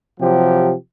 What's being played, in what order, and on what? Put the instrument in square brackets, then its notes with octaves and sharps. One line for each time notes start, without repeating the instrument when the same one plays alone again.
[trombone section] C3 F3 F#3 G4